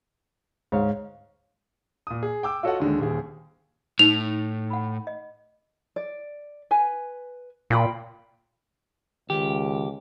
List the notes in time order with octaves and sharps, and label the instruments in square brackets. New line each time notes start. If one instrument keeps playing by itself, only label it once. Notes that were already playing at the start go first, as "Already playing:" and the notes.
[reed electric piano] D2 C#5 F5 [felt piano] G#2
[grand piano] A#2 D#6
G#4
G5 D6 E6
F4 F#4 A4 C#5 D#5 F#5
D#2 D3 G#3
D#1 D#2 G#4
[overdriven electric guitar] A2 [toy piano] D#4 [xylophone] F7
[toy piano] F#5 B5
D#5
[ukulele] D5
B4 G#5
[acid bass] A#2 [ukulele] F4 G5 B5
[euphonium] C#2 [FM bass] D#3 [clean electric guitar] G4